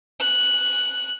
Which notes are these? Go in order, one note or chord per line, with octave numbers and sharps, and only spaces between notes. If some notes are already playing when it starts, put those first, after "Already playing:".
F#6